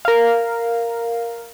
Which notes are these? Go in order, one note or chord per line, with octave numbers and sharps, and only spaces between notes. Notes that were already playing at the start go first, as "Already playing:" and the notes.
A#4 F5